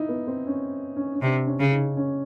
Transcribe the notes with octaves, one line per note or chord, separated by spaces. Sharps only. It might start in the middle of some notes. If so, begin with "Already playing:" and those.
Already playing: D#4 E4
B3
C4
C#4
C#4
C#4
C3 D4
C#4
C#3
D#4
C#4